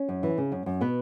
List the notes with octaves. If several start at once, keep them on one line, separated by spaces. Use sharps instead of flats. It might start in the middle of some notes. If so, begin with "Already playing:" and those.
Already playing: C#4
F#2
E3
C#3
F#2
F#2
B2 B3